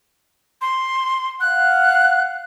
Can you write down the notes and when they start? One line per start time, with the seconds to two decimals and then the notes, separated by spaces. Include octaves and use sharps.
0.61 C6
1.41 F5 F#5 F#6